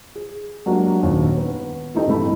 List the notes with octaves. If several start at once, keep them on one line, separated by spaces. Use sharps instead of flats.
G#4
F#3 G#3 A#3 D4 F#4 G4
D#1 D#2 C#4
B3
E3 A3 D#4 G4
C2 G2 E3 A3 B5